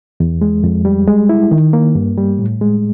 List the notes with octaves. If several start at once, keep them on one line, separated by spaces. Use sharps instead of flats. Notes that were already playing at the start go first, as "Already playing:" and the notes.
E2
G#3
F2
G3
G#3
E4
D#3
A#3
G2
G3
A2
G#3